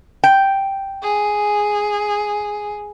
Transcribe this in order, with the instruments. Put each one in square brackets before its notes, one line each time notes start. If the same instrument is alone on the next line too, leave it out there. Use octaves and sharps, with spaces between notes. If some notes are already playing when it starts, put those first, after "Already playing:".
[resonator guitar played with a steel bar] G5
[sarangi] G#4